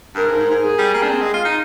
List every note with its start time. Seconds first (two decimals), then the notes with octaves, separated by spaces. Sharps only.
0.15 G2 A#4
0.27 G#2
0.39 G#2
0.51 G#2
0.62 G#4
0.78 G3
0.94 A#3
1.03 D4
1.09 C4
1.22 G#3
1.34 F4
1.45 D#4